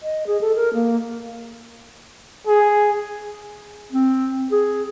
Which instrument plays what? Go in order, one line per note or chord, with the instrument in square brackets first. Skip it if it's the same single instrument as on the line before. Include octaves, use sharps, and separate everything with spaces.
[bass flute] D#5
G#4
A4
A#4
A#3
[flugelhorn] G#4
[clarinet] C4
G#4